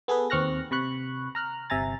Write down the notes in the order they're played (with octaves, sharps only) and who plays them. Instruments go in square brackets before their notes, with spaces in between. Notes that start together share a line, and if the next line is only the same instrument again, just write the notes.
[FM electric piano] B3 G#4 A4 B4
D#2 C4 C#6 F6 F#6 A#6
C3 B5 C#6 F#6
A#5 F6 F#6
G1 C3 E5 G#5 A#5 A6